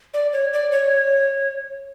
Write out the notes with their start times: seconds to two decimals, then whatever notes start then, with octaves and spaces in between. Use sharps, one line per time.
0.14 D5
0.33 C#5
0.53 D5
0.72 C#5